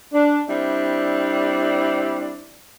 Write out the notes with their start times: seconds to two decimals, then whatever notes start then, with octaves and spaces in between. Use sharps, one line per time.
0.12 D4
0.48 G3 C4 D4 E4